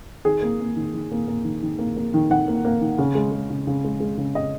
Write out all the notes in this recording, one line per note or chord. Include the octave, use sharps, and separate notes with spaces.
D#3 G#4
A#3
A#3
D#3
D#3
A#3
A#3
D#3
D#3
A#3
A#3
D#3
D#3 F#5
A#3
A#3
D#3
C#3
G#3
G#3
C#3
C#3
G#3
G#3
C#3
C#3 D#5